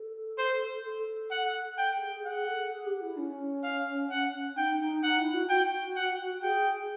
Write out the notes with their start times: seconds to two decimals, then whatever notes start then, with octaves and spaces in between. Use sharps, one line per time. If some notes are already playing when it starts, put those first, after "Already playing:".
Already playing: A4
0.38 C5
0.84 A4
1.31 F#5
1.78 G5
1.96 A4
2.01 G#4
2.24 G#4 F#5
2.47 A4
2.71 G#4
2.86 G4
3.01 E4
3.17 C#4
3.63 F5
4.10 F#5
4.57 D#4 G5
4.80 D#4
5.03 D#4 F#5
5.19 E4
5.34 F#4
5.49 F#4 G5
5.96 F#5
6.42 G#4 G5